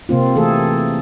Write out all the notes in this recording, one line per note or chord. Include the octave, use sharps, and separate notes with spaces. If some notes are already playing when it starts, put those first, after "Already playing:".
C3 A#3 C4 F4
E3 A3 C4 G#4 A4